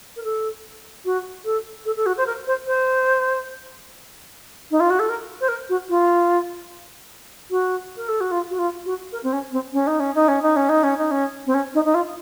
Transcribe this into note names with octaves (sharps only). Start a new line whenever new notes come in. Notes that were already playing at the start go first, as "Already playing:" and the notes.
A#4
A4
F#4
A4
A4
A4
F#4
C5
A#4
C5
C5
D#4
F4
F#4
A4
A#4
C5
A#4
F#4
F4
F#4
A#4
A4
F#4
F4
F#4
F4
F#4
A#4
C4
C#4
C4
C#4
D#4
C#4
D#4
C#4
D#4
C#4
D#4
C#4
D#4
C#4
C4
C#4
D#4
D#4
F4